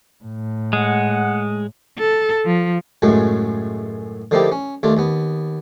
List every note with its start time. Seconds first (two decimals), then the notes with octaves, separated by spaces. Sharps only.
0.24 A2
0.73 G#3 F#5
1.99 A4
2.46 F3
3.02 C#2 F#2 A2 F#3 G#3 C#5
4.31 D3 F3 A#3 D#4 E4 G4
4.52 C#4
4.83 D#2 A3 D4 F4
4.97 D#2 B3